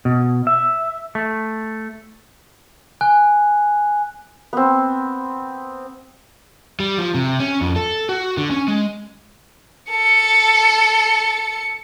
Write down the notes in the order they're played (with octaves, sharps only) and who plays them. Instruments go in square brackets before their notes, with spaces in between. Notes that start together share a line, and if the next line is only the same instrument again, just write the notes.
[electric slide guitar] B2
E5
A3
[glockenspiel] G#5 F#6
[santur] B3 C4
[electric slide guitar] G3
F3
C3
C#4
F2
A4
F#4
D3
C#4
G#3
[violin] A4 C#7